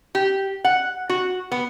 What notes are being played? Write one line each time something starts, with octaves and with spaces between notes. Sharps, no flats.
G4
F#5
F#4
B3